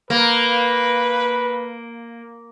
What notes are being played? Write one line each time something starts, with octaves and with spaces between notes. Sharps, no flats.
A#3 B4